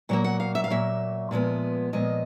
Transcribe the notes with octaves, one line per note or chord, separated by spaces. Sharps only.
A#2 F#3 A#3 F#5
F#5
F5
E5
F5
A#2 F#3 A#3 E5
A#2 F3 G#3 B3
A#2 F3 G#3 B3 D#5